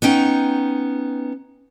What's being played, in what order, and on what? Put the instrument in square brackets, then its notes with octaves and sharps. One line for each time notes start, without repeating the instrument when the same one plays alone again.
[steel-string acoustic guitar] B3 C#4 D#4 G5